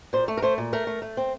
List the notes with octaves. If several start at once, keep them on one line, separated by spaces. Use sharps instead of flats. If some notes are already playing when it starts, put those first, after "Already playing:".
A#2 C5
A3
A#4
A3 C5
A#2
A3 A#4
A3
A3
C4